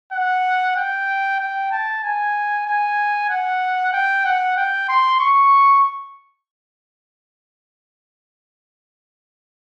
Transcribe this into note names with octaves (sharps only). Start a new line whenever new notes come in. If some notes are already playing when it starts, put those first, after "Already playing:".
F#5
G5
G5
A5
G#5
G#5
F#5
G5
F#5
G5
C6
C#6